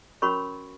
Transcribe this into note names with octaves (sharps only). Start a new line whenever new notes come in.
C#4 F#4 A#4 C#5 B5 C#6